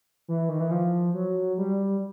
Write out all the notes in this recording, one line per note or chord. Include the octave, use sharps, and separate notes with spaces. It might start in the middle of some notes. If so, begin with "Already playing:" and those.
E3
D#3
E3
F3
F#3
G3